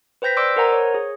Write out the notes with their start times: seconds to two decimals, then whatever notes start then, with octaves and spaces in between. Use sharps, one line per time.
0.22 B4 C5 G5 G6 A#6 B6
0.37 C5 D5 C6 D6 E6 D7
0.56 A#4 C5 F#5 G#5 A#5
0.72 C#5
0.94 G#4